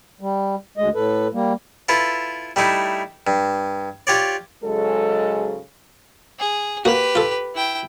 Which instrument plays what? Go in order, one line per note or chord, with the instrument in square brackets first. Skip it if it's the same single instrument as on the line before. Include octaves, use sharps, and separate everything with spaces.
[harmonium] G3
D2 G#3 D#5
A2 A4 B4
G3 A#3
[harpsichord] E4 F4 A4 B4
G3 A3 D#4 E4
G2
F4 G4 C#5 D5
[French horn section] G#2 C#3 F#3 G#3 A4
[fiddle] G#4
[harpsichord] A#3 F#4 [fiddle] G4 B4
[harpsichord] F4 A4
[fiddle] E4 G5